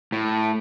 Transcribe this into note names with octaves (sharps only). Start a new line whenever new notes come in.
A2